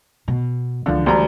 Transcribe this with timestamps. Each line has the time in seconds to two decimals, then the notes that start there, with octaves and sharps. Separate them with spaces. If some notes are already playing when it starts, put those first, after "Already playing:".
0.28 B2
0.86 C#2 D3 E3 F3
1.06 D2 G3 A#5